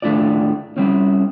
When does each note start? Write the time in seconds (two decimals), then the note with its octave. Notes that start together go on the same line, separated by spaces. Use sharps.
0.02 D#2 A2 A3 D4 F4 D5
0.77 G3 C4 C#4